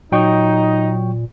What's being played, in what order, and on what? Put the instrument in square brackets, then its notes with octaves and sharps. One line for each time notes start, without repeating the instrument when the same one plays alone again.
[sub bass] A#2 [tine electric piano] F#3 G5 C#6 [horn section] D#4